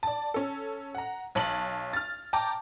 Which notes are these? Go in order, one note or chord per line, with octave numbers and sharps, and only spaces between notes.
D5 A5
C#4 A4
F#5 A#5
B1 C#5 A5 F#7
F6 A6
G5 A5 A#5 D6